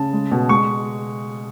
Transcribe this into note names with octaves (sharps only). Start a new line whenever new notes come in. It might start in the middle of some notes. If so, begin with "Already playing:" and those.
Already playing: C#3 A5
G#3
B2
G#3 C#6